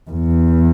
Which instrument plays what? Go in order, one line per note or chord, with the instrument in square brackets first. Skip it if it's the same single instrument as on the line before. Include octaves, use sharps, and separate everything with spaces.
[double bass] E2